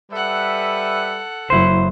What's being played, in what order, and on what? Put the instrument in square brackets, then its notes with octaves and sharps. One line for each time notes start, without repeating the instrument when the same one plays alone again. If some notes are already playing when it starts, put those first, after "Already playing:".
[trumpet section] G3 B4 E5 [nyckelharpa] A4 F#5
[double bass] F#1 F#3 [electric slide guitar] E4 C5